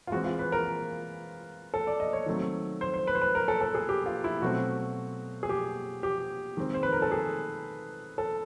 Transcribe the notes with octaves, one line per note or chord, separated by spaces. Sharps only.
F4
E3 G#3 C4 F#4
F4
B4
A#4
A4
D5
D#5
C#5
D#3 F#3 A3 C4
C5
C5
B4
C5
B4
A#4
A4
A4
G#4
G4
F4
E4
B2 F#3 A3 C4 F#4
G#4
G4
G4
D#3 G#3 C4
C5
B4
A#4
A4
G#4
A4